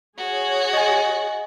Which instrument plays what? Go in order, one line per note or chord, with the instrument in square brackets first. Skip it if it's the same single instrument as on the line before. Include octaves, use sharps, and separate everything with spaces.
[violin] F#4 [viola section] G#4 C#5
[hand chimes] D#5 G#5